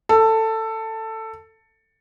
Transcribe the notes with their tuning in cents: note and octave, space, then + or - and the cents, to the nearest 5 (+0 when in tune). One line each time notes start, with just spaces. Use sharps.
A4 +15